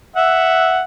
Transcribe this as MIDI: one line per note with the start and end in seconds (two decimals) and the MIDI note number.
0.16 0.82 76
0.16 0.82 78